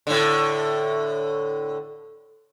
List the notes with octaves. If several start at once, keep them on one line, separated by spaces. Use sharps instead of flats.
A2 D3